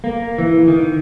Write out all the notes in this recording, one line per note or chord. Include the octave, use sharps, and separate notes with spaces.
A#3
E3
D#3